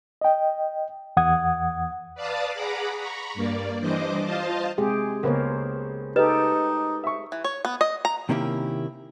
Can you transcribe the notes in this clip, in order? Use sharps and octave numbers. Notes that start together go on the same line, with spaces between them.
D#5 G5
E2 F#5 D#6 G#6
B4 D5 F5 A5 D6 D#6
G#4 F#5 A#5 B5 D6
A#5 B5 C#6
G2 A#3 D5
E3 G3 D4 C5 D#5 D6
F4 C5 D#5 F5 A5
C3 G#3 G4 G#4
C#2 A#3 B3 A#4 C5 C#5
D#4 G4 A4 B4 D#5
E5 C#6
E3
C#5
B3
D#5
A#5
C3 D#3 A#3 C#4 E4 G4